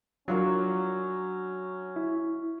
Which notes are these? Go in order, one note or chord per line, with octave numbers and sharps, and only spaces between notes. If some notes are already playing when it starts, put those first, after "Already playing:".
F#3 C#4 D4 F4 A#4
E4